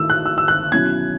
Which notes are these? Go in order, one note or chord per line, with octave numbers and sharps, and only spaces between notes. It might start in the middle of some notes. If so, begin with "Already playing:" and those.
Already playing: D#3 A3 E4 E6
F#6
E6
E6
F#6
B2 F#3 C#4 E4 G#6